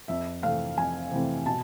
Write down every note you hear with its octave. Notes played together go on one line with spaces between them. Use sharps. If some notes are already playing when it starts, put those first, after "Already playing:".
F2 E5
C3 E3 A3 C4 F5
F2 G#5
C3 E3 A3 C4
B2 A5